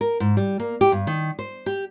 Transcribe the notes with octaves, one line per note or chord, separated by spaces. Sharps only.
A#4
G#2
G3
A#3
G4
G2
D#3
C5
G4